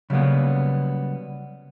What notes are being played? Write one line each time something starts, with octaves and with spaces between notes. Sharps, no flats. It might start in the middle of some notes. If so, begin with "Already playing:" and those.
C#3 F#3 G3 A#3 B3